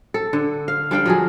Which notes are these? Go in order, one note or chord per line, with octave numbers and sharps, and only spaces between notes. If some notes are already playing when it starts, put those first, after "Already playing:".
A4
D3
F5
G3 D4 F5 G5
F3 F#3 G#4